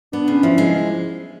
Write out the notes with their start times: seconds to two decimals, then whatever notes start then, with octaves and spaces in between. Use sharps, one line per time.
0.12 B3 D4
0.28 C#3
0.43 F3 E4
0.58 G#3